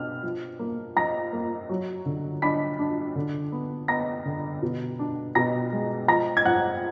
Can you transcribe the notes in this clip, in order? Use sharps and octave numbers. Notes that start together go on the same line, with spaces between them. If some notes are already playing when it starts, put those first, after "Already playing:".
Already playing: B2 D4 F6
F3
A#3
F3 A#5 A#6
A#3
F#3
D3
D4 B5 B6
D4
D3
B3
B3 A#5 A#6
D3
B2
D4
B2 A#5 A#6
G#3
F3 A#5 A#6
G#6
F3 F#5 F#6